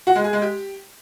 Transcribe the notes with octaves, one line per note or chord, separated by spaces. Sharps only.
F#4
G#3
G#4
G#3
G4